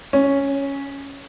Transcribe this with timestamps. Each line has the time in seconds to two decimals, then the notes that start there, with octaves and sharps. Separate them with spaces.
0.13 C#4